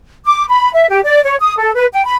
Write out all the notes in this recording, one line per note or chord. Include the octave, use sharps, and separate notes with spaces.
D6
B5
E5
G4
D5
C#5
D#6
A4
B4
G5
B5